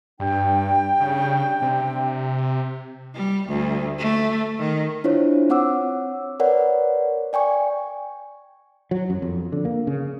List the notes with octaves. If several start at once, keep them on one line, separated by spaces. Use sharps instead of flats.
G2 G3 D4 G5
C#3
C3
G3
D2
A3
D#3
D4 E4 F4 C5 C#5
C4 C#5 F#5 D6 E6
A#4 B4 C#5 D5 F#5
D5 G5 G#5 C#6
F#3
F#2
F2
D3
A#3
C#3